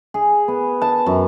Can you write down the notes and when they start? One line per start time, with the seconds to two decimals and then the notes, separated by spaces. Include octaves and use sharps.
0.14 G#4
0.48 B3
0.82 A5
1.06 F#2